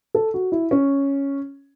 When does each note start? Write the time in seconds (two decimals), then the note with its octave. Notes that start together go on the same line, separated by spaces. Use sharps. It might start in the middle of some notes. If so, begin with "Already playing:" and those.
0.14 A4
0.34 F#4
0.52 E4
0.71 C#4